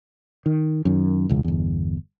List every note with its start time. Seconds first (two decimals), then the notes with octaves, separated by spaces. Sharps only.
0.46 D#3
0.85 F#2 D#3
1.29 E1 C#2
1.44 G1 E2